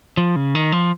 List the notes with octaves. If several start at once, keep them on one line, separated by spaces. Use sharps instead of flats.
F3
C#3
D#3
F3